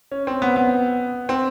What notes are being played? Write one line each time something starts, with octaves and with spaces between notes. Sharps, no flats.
C#4
C4
B3
B3
C4